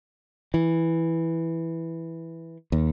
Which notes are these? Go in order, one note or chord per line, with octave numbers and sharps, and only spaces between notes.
E3
D#2